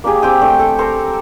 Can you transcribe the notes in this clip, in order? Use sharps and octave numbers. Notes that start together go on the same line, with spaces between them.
A#3 D4 G4 G#4
C4 G4 G5 D#6
A3 D4 G5
A4
A4 A#4 C5 A#5